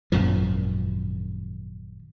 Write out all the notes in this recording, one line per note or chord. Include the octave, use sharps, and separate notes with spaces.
G#1 F#2 A#2 F3